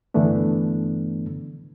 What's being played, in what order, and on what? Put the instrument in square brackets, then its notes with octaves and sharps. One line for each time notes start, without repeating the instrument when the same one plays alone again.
[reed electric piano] G2 D3 E3 A3 B3 D4